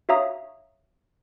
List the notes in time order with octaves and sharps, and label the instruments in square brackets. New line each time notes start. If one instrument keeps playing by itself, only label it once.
[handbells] F#4 C#5 E5 F5 A#5 D#6